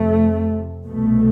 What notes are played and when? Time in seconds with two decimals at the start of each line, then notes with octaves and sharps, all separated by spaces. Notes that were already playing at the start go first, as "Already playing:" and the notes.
Already playing: F2 C3 A3
0.87 C2 B2 A3